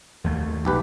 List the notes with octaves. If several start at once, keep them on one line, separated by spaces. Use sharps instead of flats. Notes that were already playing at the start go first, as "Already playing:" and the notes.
D#2 A3
B1 G4 B4